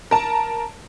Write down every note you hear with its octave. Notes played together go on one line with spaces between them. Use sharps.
A#4 A5